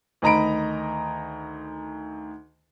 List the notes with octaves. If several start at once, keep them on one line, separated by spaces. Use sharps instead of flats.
D2 D#3 D#5 A#5 B5 D7